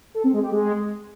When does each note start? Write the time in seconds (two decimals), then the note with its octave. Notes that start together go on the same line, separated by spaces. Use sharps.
0.15 A4
0.24 C4
0.33 G#3
0.42 G4
0.52 G#3